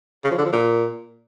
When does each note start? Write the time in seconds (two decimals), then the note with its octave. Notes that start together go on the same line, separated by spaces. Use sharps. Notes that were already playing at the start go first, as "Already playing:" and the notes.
0.24 C#3
0.31 F3
0.38 D3
0.45 F3
0.52 A#2